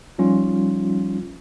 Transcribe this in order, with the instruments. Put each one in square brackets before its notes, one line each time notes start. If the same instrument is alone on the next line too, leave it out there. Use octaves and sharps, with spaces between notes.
[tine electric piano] F3 G3 C#4 D#4 F4